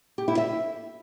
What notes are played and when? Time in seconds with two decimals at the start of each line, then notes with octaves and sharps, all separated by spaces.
0.18 G4
0.28 E4
0.38 E5